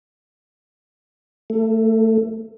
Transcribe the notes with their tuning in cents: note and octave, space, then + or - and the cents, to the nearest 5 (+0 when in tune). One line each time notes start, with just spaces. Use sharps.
A3 +20